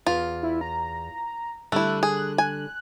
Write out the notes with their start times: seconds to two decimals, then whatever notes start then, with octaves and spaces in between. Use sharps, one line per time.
0.06 E2 F4
0.43 E4
0.61 A#5
1.72 D3 G3 A3 E4 F#6
2.03 G#4
2.38 G#5